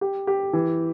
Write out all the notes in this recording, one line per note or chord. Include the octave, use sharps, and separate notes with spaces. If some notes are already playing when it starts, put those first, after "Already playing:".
G4
G4
E3